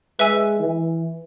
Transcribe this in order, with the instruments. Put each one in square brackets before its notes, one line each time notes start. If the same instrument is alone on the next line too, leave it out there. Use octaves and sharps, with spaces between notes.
[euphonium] G#3 [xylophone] B4 E5 G#5 E6
[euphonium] E3